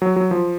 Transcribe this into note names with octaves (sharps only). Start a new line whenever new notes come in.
F#3
F#3
F3